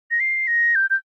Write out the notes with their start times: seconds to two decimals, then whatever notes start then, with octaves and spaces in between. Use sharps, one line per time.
0.11 A#6
0.20 C7
0.47 A#6
0.75 G6
0.90 G6